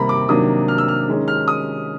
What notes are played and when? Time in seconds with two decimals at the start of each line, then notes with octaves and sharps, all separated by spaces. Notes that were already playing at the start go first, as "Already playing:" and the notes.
Already playing: C3 D#3 G3 A#3 A#5 B5
0.09 D6
0.29 C3 D#3 F#3 A#3 D4 D#6
0.68 F6
0.78 E6
0.88 F6
1.08 D#3 G#3 C#4
1.28 F6
1.48 D#6